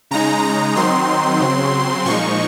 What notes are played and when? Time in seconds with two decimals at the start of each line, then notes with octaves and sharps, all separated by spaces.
0.11 C#3 G#3 D#4 A#5
0.44 A#5
0.76 D#3 F#3 C4 D#4 C6
1.41 C#3 F#3 C4
2.05 A#2 F3 G#3 D#4 C#6